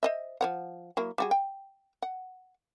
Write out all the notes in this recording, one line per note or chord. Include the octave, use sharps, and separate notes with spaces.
C5 D#5 E5
F3 C#5 F#5
F#3 A#3 E4
G3 F#4 G#4
G5
F#5